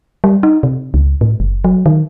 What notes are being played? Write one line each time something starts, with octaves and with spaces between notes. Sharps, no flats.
G3
D#4
C3
C#2
A2
F#1
F#3
D#3